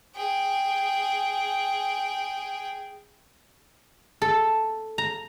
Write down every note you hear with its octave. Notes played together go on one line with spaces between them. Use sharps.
G#4 G5
A4
A#5